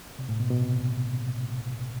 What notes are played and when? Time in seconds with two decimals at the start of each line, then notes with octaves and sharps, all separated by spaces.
0.19 C3
0.29 A2
0.40 B2
0.50 B2
0.62 C3